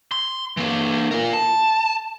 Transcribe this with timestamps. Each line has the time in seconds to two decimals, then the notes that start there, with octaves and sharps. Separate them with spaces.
0.12 C6
0.57 E3 A#3
1.11 F4 A#4
1.33 A5